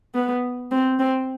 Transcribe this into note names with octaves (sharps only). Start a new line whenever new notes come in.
B3
C4
C4